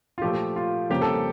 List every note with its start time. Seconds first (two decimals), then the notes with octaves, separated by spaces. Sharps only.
0.18 F4
0.22 A#2 F3 A3 G4
0.56 F4
0.90 F2 C#3 G3 A#3 G4
1.02 A4